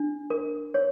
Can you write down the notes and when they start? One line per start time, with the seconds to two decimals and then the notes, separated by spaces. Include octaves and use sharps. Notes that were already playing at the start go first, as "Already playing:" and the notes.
Already playing: D4
0.30 A#4
0.74 C#5